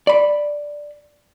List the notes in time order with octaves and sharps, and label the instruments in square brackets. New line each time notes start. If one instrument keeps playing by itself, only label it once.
[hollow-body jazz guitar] D5 B5